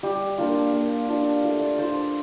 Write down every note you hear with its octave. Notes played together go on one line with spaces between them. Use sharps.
G3 G4
A#3 D4 F4
A#3
D4 F4
A3 F4
D5
D4 F4 C5